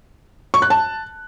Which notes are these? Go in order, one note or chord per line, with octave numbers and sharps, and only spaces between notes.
C#6
F#6
A5